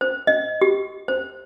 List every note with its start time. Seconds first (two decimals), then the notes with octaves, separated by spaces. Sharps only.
0.01 C5
0.27 D#5
0.61 G4
1.08 C5